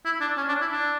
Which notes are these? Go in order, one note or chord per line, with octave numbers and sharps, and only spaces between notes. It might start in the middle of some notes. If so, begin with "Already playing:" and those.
E4
D4
C#4
D4
E4
D4